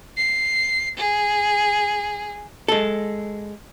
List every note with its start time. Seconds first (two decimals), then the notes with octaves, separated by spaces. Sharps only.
0.17 C7
0.97 G#4
2.68 G#3 A4